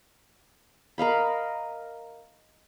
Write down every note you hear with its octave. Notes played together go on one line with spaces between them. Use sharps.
A#4 D#5 F5 B5